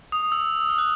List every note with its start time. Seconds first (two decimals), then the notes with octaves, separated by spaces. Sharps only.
0.12 D#6
0.32 E6
0.69 F6
0.78 F#6